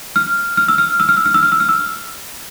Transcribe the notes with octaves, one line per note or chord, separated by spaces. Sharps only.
F6
F6
E6
F6
E6
F6
E6
F6
E6
F6
E6
F6
E6